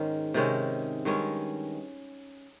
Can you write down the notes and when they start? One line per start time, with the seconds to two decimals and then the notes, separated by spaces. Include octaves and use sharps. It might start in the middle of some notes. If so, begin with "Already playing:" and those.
Already playing: G#2 D#3 G#3 C#4
0.34 C3 D#3 G#3 C#4
1.05 G2 D#3 G#3 C#4